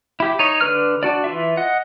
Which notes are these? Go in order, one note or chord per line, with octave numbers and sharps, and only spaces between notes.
E4 G4
D#4 C#5
D3 D4 B4 F6
D4 F#4 D5
E3 F4 E5
D#5 F#5